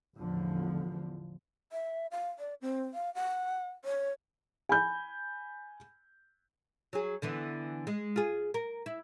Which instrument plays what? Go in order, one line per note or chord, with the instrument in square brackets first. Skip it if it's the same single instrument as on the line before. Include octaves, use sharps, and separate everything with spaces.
[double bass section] A1 E2 D3 F3
[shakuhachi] E5
F5
D5
C4
F5
F#5
C#5
[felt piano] G#5 B5 G6
[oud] F#3 G#4
D3 E3 B3
G#3
F4 G#4
A#4
E4